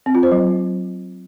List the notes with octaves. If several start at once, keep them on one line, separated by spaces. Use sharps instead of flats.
C4
F4
C5
F#3